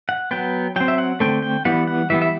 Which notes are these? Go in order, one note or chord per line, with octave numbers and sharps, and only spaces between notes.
F#5
F#3 B3 G5
F#3 C4 G5
E5
F#5
D3 A3 C4 G5
G5
E3 G3 B3 F#5
F#5
E3 G3 B3 E5
E5